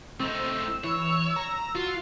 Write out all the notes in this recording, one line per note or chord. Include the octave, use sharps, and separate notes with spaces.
A3 C4 D#4 E6
E3 C#5
A#5
F4 F#4